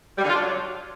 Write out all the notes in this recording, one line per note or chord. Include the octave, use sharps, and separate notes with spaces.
G3
D3
F4
D4
F#3